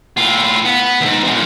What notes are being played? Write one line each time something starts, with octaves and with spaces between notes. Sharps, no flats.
A2 F4
B3
D#2 G#2
E2 A#2